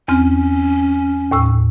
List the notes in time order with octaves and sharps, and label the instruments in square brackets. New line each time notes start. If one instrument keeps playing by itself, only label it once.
[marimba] E2 C4 F6 [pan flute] C#4
[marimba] D#2 A2 E6